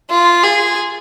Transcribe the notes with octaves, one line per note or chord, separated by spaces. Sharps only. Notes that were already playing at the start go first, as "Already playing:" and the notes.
F4
G#4